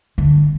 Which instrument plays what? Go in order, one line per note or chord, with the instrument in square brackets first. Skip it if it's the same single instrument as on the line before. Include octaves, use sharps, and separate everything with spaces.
[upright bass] D3